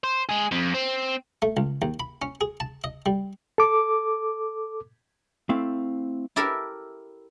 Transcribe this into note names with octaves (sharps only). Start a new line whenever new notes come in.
C5
G#3 G#4
F2
C4
A3
C#2
D#2
B5
C#4
G#4
A5
D#5
G3
A4 D6
A3 C4 E4 F5
E4 G4 A4 A#4 E5